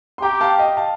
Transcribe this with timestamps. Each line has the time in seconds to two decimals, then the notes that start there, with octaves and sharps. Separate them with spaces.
0.18 C6
0.22 G4 G5 A#5
0.41 F5 A5
0.59 D#5 G5
0.77 F5 A5